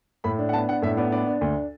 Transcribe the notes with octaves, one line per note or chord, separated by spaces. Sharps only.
A2 B5
D4
F#5
B3 A5
D4 F#5
A2 E5
B3 D5
D4 D5
D4
D2